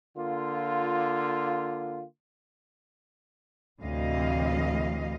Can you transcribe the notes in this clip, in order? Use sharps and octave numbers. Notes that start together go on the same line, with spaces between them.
D3 A#3 F4
D2 A2 C3 E3 D#5 F5